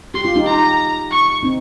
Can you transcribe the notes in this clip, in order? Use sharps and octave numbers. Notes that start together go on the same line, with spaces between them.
G4 C6
F4
D#4 G4
A#5
C#6
C4 D#4